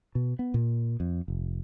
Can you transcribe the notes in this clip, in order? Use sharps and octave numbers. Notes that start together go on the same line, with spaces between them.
B2
B3
A#2
F2
F1